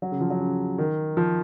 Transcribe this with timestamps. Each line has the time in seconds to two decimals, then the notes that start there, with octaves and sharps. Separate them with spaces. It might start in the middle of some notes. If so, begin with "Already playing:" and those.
0.02 F#3
0.12 C#3
0.21 F3
0.30 F#3
0.40 C#3
0.78 D#3
1.17 F3